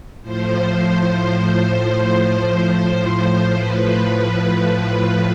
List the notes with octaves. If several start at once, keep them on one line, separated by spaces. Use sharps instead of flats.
A2 F3 C5
A2 F3 B4